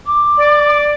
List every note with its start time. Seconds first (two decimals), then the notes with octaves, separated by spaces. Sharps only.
0.06 D6
0.38 D5